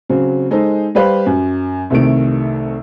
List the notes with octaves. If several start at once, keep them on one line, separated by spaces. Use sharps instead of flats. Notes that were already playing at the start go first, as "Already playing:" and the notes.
C#3 F#3 C4
G#3 D#4 A4 C5
G3 G4 B4 C5 F5
F#2
C2 C3 D#3 A3 D7